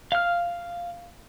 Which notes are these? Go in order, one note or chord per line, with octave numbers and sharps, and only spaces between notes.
F5 F6